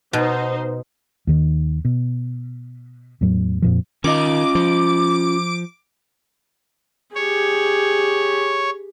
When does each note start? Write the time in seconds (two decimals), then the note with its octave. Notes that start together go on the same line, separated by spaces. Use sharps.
0.13 B2 D#4 C5
1.27 D#2 D#3
1.85 B2
3.21 E2 A2 F#3
3.62 F2 A#2 F3
4.04 D#3 C#4 F4 D#5 D6
4.55 F3
7.16 G4 G#4 C#5